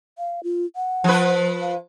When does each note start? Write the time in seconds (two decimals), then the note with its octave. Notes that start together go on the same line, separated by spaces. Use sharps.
0.18 F5
0.43 F4
0.76 F#5
1.04 F3 B4
1.61 F5